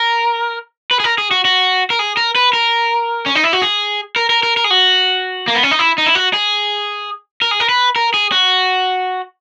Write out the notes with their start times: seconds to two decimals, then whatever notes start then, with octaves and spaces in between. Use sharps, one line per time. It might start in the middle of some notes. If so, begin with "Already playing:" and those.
Already playing: A#4
0.91 B4
1.00 G#4
1.04 A#4
1.18 G#4
1.31 F#4
1.45 F#4
1.90 A#4
1.99 G#4
2.17 A#4
2.36 B4
2.53 A#4
3.26 C#4
3.35 D#4
3.44 E4
3.53 F#4
3.62 G#4
4.16 A#4
4.30 A#4
4.43 A#4
4.57 A#4
4.64 G#4
4.71 F#4
5.48 A#3
5.55 B3
5.63 C#4
5.71 D#4
5.79 E4
5.98 D#4
6.06 E4
6.15 F#4
6.33 G#4
7.42 A#4
7.51 G#4
7.60 A#4
7.69 B4
7.96 A#4
8.14 G#4
8.32 F#4